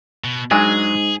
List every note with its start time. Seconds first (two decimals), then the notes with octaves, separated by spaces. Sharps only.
0.24 B2
0.51 G#2 F#3 G#3 D4 G#4 G#5